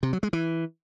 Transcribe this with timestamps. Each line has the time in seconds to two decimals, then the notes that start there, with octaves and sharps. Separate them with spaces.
0.03 C3
0.13 F#3
0.23 G#3
0.33 E3